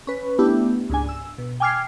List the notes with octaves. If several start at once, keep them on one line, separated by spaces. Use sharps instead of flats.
C#4 B4
A3 B3 D4 E4 G4
C#2 G#2 D4 G#5
E6
B2
G5 G#5 D6 F6 G#6 C7